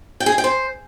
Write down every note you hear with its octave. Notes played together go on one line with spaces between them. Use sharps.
G5
G#4
G#5
G5
C5